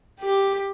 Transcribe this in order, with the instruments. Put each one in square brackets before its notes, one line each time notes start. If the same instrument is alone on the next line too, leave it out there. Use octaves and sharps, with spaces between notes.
[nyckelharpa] G4